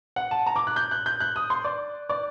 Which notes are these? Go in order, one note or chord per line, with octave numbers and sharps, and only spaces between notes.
F#5
A5
A#5
D6
F#6
G6
F#6
G6
F#6
D#6
C6
D5
D5